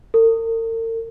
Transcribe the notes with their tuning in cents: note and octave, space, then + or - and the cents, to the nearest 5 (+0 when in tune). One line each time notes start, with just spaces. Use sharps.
A#4 -45